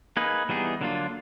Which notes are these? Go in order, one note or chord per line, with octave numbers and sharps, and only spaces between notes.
A#3 D#4 G#4 B4
E3 G3 B3 D#4 G#4
D3 F#3 A#3 D4 F4